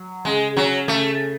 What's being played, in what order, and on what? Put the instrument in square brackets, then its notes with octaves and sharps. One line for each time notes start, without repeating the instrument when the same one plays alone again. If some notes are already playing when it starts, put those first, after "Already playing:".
Already playing: [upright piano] F#3
[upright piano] C#3 [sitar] G#3
[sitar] F#3 [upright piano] C#4
[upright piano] C#3 [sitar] A3